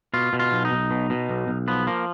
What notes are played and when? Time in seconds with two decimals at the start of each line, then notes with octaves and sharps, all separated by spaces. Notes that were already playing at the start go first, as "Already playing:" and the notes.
0.14 B2 F4
0.33 B2
0.39 F4
0.52 B1
0.65 D#4
0.72 B1
0.91 B2
1.10 B2
1.29 B1
1.48 B1
1.68 F3 B3
1.87 F3 A#3